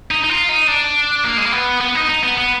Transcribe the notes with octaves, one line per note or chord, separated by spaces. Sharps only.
D#4
D#4
F4
D#4
D4
A#3
G#3
A#3
B3
B3
D#4
D#4
B3
B3